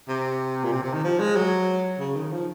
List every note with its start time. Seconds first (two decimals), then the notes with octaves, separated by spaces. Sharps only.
0.09 C3
0.64 A#2
0.72 C3
0.83 C3
0.94 D#3
1.04 F3
1.20 G#3
1.36 F#3
2.00 C#3
2.16 D#3
2.32 F3